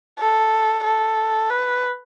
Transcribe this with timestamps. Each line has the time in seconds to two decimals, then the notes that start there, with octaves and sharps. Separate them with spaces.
0.19 A4
0.84 A4
1.50 B4